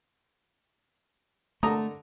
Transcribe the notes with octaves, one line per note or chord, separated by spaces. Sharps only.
D3 A3 A#5 D#6